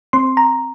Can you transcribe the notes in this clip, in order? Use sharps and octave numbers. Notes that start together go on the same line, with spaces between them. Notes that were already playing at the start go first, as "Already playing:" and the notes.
C4 C6
A#5